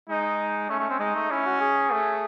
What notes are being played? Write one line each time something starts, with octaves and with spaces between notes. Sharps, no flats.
G#3 D#4
A3 C#4
A3
C4
G#3 D#4
A3
C#4 E4
F#4
G#4
A3